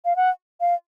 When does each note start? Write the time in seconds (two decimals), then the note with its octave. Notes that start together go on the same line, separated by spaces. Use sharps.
0.05 F5
0.16 F#5
0.61 F5